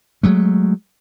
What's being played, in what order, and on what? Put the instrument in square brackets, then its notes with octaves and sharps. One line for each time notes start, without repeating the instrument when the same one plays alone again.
[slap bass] F#3 G#3 A3